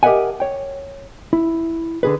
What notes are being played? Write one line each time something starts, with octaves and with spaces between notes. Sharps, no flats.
G4 A#4 D#5 E5 F#5 G#5
C#5 G5
E4
D3 G#4 B4